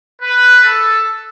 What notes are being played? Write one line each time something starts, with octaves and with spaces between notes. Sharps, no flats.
B4
A4